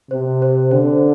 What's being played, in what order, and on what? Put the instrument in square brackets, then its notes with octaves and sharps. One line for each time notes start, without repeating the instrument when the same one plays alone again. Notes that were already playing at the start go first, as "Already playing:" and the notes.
[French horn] C3 [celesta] C5
[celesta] C5
[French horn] D3 [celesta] C5